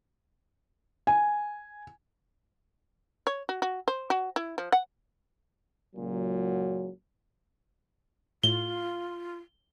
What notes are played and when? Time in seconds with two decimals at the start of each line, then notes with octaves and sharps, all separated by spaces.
1.07 G#5
3.27 C#5
3.49 F#4
3.62 F#4
3.88 C5
4.10 F#4
4.36 E4
4.58 F3
4.72 F#5
5.96 F#1 C#2 A#2 F#3
8.43 A2 F4 G7